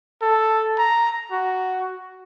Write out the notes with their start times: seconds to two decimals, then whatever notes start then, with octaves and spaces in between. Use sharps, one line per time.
0.22 A4
0.78 A#5
1.31 F#4